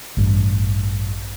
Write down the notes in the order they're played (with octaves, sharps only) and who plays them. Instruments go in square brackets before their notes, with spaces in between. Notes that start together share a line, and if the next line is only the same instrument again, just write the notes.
[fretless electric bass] A1 G2